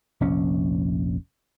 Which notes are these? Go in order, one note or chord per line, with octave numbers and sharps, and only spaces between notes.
F1 A#1 C#4